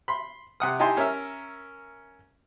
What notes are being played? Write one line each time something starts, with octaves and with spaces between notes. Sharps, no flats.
B5 C6
C3 F#5 D#6
D#4 E4 G4 G#5 A5 C6
C#4 A#4 C#5 E5